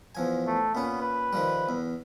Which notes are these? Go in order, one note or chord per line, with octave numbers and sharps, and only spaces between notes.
E2 F3 G#5
A3
A#2 B3 C#4
B4
D#3 F3 G3
E2